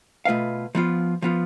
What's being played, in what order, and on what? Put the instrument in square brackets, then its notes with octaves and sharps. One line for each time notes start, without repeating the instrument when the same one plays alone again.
[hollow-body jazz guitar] B2 A3 F4 B4 F5
F3 B3 F4
F3 B3 F4